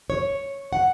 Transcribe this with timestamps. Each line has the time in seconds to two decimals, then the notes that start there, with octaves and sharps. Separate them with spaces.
0.10 C#5
0.73 F#5